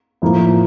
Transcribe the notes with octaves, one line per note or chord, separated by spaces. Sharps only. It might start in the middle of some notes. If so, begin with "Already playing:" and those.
A2 F3 A#3